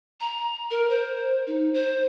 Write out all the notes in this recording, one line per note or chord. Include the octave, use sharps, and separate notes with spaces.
A#5
A#4
C5
D#4
C5